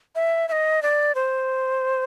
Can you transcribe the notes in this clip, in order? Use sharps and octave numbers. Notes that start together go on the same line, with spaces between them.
E5
E5
D#5
D5
C5